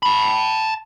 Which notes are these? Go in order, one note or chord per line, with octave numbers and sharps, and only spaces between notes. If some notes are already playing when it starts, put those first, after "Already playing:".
A5 B5